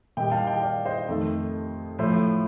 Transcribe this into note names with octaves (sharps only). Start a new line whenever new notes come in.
A#2 G3 D#5 G5
F5 A5
D#5 G5
D5 F5
C5 D#5
F2 D#3 A3
A2 F3 A3 C5